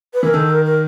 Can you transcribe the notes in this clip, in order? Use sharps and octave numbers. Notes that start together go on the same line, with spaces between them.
B4
E3 A#4
D#3 A4
A#4
A#4